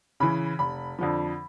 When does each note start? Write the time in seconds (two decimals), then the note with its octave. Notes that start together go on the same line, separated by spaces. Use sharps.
0.20 C#3 E3 B5
0.59 F1 B5
0.99 F2 D3 F3